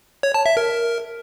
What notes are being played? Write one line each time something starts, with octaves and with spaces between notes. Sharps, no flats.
C#5
A5
E5
A#4